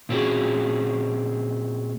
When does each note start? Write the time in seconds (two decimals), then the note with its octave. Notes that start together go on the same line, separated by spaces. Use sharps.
0.09 A#2 C4 C#4 F#4 G#4